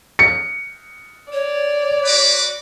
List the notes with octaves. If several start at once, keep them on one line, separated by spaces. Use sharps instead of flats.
C#7
C#5 D5
F#4 B4 D6